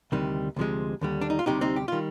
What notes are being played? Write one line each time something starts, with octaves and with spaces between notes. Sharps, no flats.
D2 C3 D#3 G3
D2 C3 F3 G#3
D#2 D3 G3
D4
D#4
F4
D2 C3 G3 D#4 G4
C4 D#4
G4
D#3 G3 F4